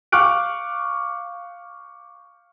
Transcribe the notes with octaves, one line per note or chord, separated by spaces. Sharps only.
F5 C#6 D6 F6 F#6 D7